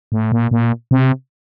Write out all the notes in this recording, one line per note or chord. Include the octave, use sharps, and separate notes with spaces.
A2
A#2
A#2
C3